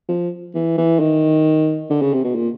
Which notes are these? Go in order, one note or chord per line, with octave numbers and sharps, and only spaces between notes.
F3
E3
E3
D#3
D3
C#3
C3
B2
A#2